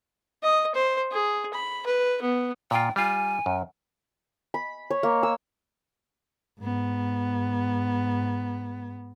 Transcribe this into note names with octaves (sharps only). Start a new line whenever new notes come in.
D#5
C5
G#4
B5
B4
B3
A#2 F4 G5
G3 F4 G#5
F#2
B5
C#5
A#3
E6
G#2 B3